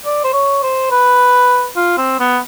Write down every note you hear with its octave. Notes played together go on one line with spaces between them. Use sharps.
D5
C5
C#5
C5
B4
F4
C4
B3